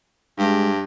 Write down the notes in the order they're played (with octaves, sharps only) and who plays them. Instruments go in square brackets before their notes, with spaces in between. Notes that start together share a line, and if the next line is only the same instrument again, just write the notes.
[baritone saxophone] G2 [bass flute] G#3